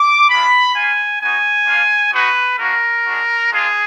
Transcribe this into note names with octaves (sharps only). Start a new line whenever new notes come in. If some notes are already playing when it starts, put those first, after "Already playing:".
Already playing: D6
G#3 D4 F4 B5
A#3 F4 G#5
B3 D#4 F#4 G#5
A#3 D4 F4
G#3 D#4 F#4 B4
A#3 D4 F#4 A#4
G#3 D4 F#4
G#3 D4 F4 G#4